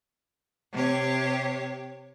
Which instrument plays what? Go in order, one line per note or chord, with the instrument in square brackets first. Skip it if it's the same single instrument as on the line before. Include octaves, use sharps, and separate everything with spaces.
[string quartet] C3 G4 C#5